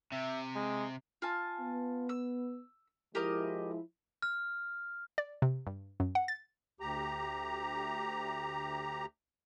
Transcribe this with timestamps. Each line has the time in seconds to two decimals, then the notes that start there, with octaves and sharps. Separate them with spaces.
0.12 C3 E5
0.56 G#3
1.22 F4 G#5 A5
1.61 B3
2.09 E6
3.15 F3 G#3 E4 G4 A#4 D#5
4.22 F6
5.18 D5
5.42 C3
5.67 G2
6.00 F#2
6.15 F#5
6.28 A6
6.80 D2 G4 A#5